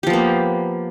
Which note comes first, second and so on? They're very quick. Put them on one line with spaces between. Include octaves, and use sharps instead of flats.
G4 F3 B3 A#3